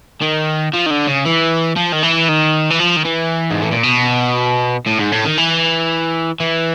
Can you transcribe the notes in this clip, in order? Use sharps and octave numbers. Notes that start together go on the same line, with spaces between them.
D#3
F3
D#3
D3
C#3
E3
F3
D#3
E3
D#3
E3
F3
D#3
E3
G#2
A2
A#2
B2
A2
G#2
A2
D#3
E3
E3